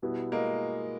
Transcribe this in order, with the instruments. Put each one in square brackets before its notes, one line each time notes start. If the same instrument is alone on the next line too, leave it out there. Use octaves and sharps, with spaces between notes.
[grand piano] B2 G3 B3 E4
[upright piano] G#3 A#3